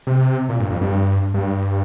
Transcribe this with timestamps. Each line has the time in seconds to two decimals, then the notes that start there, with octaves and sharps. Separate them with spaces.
0.07 C3
0.49 A#2
0.60 G2
0.70 F2
0.81 G2
1.34 G2